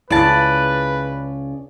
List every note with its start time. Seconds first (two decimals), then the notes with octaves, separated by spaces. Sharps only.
0.10 C#2 C#3 E4 B4 D5 A5